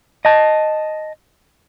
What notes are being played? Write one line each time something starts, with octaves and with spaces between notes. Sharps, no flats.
D#5 A5